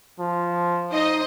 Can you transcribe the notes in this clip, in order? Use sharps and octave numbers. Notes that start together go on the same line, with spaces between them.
F3
D#4 C5 D#5